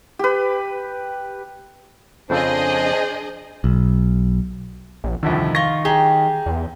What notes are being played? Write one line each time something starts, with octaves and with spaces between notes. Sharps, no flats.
G4 B4
F2 C#3 D4 G#4 A4 C5 D#5
B1
A#1
C2 F2 D3 D#3
F4 C#6 A#6
G4 G#4 A#5
E2